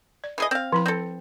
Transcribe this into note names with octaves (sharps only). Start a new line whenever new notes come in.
D5
E3 G#4 D#5
C4 F5
F3 E4 B5
C4 A4